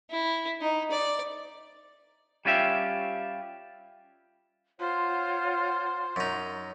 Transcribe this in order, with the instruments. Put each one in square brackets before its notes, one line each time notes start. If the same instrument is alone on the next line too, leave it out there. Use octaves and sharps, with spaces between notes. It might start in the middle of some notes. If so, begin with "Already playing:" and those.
[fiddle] E4
D#4
D5
[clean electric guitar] G3 C#4 F4 G4 E5
[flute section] F4 C#5 F#5 [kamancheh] C5
[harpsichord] F#2 D#4